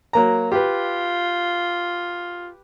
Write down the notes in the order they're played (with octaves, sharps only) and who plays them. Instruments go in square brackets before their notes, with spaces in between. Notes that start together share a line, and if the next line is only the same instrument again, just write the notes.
[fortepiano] F#3 A#3 A#5
[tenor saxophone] F4 [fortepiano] G4 B4